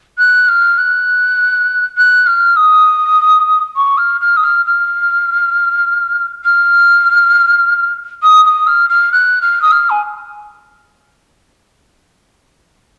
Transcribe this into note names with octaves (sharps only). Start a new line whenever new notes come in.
F#6
F6
F#6
F#6
F6
D#6
C#6
F6
F6
D#6
F6
F6
F6
D#6
D#6
F6
F6
F#6
F6
D#6
F6
G#5